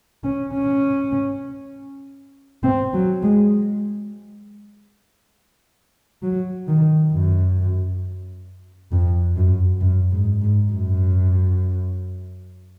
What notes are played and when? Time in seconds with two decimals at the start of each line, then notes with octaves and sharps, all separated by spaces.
0.24 C#4
0.53 C#4
2.63 C4
2.93 F#3
3.23 G#3
6.22 F#3
6.67 D#3
7.11 F#2
8.92 F2
9.36 F#2
9.81 F#2
10.11 G#2
10.42 G#2
10.71 F#2